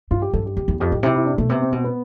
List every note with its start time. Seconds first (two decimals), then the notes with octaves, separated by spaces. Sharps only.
0.11 G2 F4
0.22 G4
0.33 G2 A4
0.46 G4
0.57 E2 G4
0.68 E2
0.80 F2 G4
0.92 A2
1.03 C3 E4
1.15 E4
1.26 D4
1.38 B2 A3
1.49 C3 B3
1.62 C4
1.72 B2 C4
1.84 B3